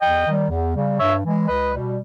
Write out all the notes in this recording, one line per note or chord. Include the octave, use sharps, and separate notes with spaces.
E2 D#5 G5
D#3 G3
E2
C#3 G3
G2 C#5 E5
E3 G#3
C#2 B4 D#5
B2 G3